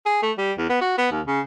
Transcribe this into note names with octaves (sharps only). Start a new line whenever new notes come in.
G#4
A3
G3
E2
B3
F#4
B3
D#2
C#3